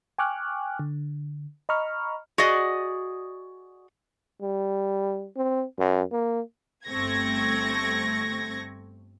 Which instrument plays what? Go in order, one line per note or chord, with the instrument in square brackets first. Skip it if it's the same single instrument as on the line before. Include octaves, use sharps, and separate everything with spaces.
[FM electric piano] G5 G#5 C#6 D6 F6 F#6
D3
D#5 A#5 B5 C#6 F6
[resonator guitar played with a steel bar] F#4 G#4 D5 D#5
[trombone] G3
C4
F#2
A#3
[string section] G1 A3 C4 C#6 G#6 A#6